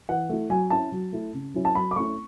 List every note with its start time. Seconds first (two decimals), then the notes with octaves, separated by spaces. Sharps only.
0.09 E3 F#5
0.29 A3 E4
0.50 F#3 G#5
0.70 C#4 E4 A5
0.92 F#3
1.12 A3 E4
1.34 C#3
1.54 F#3 C#4 E4
1.65 A5
1.75 F#3 B5
1.91 D6
1.96 A3 C#4 E4 C#6